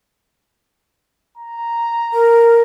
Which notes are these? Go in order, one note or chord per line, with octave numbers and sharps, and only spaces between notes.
A#5
A#4